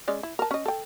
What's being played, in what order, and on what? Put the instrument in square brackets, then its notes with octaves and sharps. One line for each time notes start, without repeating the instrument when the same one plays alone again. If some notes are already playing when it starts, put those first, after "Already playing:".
[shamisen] G#3 C#4 D5
E4
A#4 A5
C#4 D#5
A4 G5